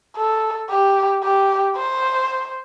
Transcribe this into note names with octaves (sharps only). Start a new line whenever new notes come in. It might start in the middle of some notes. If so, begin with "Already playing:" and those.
A4
G4
G4
C5